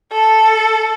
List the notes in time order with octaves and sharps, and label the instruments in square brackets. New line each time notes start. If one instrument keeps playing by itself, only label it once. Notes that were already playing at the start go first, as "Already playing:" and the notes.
[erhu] A4